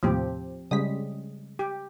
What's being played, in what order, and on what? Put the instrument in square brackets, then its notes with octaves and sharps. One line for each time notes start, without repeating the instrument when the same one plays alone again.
[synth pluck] D#2 A2 C3 [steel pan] F3 C4 G4
[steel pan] C#3 G3 G#3 [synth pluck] D#6 B6
[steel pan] G4